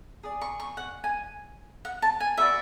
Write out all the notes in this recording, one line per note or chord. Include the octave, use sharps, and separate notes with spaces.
G#4 D5
C#6
C#6
F#5
G#5
F#5
A5
G#5
F#4 B4 D5 E5